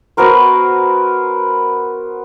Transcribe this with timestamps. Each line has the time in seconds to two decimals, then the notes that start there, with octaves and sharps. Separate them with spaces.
0.17 B3 F#4 A#4 C5